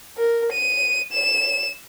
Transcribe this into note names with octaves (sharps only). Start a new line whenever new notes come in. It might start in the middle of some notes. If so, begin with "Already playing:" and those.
A#4
D#7
E7